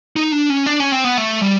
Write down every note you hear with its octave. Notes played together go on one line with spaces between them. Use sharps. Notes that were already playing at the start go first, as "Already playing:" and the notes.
D#4
D4
C#4
D4
C#4
C4
B3
A3
G3